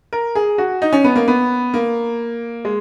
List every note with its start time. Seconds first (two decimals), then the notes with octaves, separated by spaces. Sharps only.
0.13 A#4
0.35 G#4
0.58 F#4
0.82 D#4
0.93 C#4
1.04 B3
1.16 A#3
1.28 B3
1.74 A#3
2.65 G#3